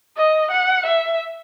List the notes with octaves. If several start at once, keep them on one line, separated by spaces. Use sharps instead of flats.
D#5
F#5
E5